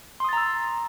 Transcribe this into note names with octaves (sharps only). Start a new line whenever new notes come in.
A#5 C6 D#6 E6 A6